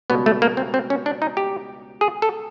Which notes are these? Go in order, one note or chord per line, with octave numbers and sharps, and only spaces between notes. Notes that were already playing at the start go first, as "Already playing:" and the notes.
C#2 B2 G3 B3
A3
A#3
C4
C4
C#4
D4
D#4
G4
G#4
A4